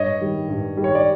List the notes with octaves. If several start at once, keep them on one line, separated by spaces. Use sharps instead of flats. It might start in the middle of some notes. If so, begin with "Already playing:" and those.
Already playing: G2 C#5 D#5
D#3 G3
G2
D#3 G3
C#5
D5